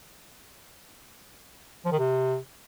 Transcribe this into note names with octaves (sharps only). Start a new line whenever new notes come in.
F3
D#3
C3